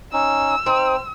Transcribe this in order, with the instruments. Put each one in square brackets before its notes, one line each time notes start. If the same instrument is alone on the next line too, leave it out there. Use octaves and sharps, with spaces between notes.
[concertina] C#4 D#4 [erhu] E6
[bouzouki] C4 [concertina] D#4